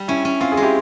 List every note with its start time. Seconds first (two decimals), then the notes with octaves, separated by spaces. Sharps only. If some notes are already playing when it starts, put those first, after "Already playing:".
Already playing: G3
0.08 C#4 E4
0.25 C#4
0.40 C4 F4
0.52 F4 G#4
0.57 G#3
0.63 E4 G4